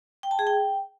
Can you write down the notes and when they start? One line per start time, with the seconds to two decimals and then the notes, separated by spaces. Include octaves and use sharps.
0.23 G5
0.31 A5
0.39 G#4
0.47 G5